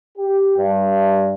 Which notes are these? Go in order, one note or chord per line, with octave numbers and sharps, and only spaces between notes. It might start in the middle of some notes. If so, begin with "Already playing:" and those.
G4
G2